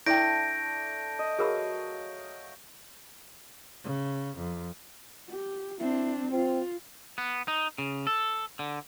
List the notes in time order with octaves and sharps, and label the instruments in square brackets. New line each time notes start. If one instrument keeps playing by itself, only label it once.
[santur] A3 D4 [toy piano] E4 G5 [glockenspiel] G6 A#6 D7
[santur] D#5
[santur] F#3 F5 [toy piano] G#4 A#4 B5
[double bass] C#3
F2
[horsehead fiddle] G4
[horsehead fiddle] C4 D4 [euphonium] E4
[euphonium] C4 [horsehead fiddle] F4
[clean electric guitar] B3
D#4
C#3
A4
D3